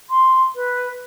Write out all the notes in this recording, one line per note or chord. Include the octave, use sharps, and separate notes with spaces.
C6
B4